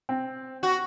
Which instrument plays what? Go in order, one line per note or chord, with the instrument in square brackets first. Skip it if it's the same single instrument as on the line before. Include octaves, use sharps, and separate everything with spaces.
[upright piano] C4
[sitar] F#4